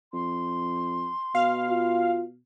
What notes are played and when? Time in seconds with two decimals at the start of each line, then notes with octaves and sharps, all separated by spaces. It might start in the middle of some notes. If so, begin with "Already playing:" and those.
0.13 F2 C6
1.35 B2 F5
1.70 F4